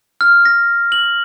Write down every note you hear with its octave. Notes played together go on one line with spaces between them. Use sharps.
F6
A#6
F#7